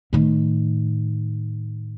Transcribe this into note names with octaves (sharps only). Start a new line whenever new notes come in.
A2 D#3